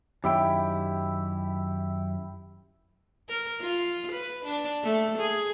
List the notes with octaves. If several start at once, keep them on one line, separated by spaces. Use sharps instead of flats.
F#2 D#3 E4 G4 G5
A#4
F4
B4
D4
A3
G#4